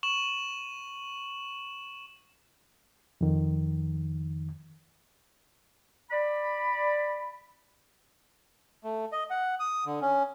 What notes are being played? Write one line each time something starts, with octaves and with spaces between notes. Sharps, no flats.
C#6 E7 F#7
F2 D#3
D5 B5
A3
D#5
F#5
D#6
D3
C#4